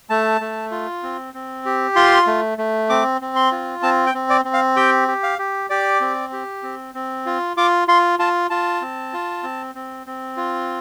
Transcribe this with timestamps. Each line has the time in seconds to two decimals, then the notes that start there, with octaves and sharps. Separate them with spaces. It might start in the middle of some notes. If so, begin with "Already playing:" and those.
0.10 A3 A5
0.41 A3
0.71 F4
1.03 C4
1.34 C4
1.66 G4
1.96 F4 C6
2.27 A3
2.58 A3
2.90 C4 D6
3.21 C4
3.36 C6
3.52 F4
3.83 C4 A5
4.06 G5
4.15 C4
4.30 D5
4.45 C4
4.53 F5
4.76 G4 G5
5.08 G4
5.23 F5
5.39 G4
5.70 G4 D5
6.01 C4
6.33 G4
6.63 C4
6.95 C4
7.26 F4
7.57 F4 D6
7.88 F4 C6
8.19 F4 A5
8.50 F4 A5
8.81 C4
9.13 F4
9.43 C4
9.75 C4
10.07 C4
10.37 F4